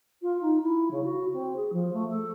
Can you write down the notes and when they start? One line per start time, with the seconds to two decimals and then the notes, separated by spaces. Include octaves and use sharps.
0.22 F4
0.41 D#4
0.63 E4
0.91 C#3
1.04 F#4
1.33 C4
1.56 G#4
1.72 F3
1.93 A3
2.10 A4